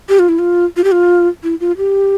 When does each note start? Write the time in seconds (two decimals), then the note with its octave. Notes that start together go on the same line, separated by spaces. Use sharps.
0.09 G4
0.19 F4
0.29 E4
0.39 F4
0.76 F4
0.84 G4
0.92 F4
1.43 E4
1.61 F4
1.77 G4